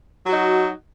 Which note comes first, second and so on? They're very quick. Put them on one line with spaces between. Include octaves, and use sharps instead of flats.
F#3 F#4 D#4